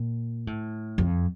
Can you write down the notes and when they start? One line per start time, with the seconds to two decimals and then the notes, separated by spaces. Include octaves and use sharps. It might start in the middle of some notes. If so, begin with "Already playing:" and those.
Already playing: A#2
0.47 A2
0.98 F2